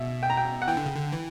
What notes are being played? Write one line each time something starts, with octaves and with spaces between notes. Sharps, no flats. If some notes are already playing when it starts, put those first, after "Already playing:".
Already playing: B2 E5
G5
A#5
G5
F#5
E3 G5
D3
C#3
D3
E3